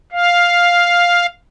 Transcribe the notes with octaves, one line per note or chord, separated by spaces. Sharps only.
F5